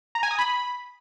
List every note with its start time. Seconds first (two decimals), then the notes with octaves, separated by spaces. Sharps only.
0.15 A#5
0.23 G#5
0.31 D#6
0.39 B5